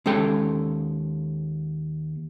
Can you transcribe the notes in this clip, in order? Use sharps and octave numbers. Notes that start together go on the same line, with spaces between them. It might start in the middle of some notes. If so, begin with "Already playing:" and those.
D#2 G#3 C#4 A4 G5